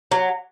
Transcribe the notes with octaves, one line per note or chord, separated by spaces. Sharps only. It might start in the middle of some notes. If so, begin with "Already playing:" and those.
F#3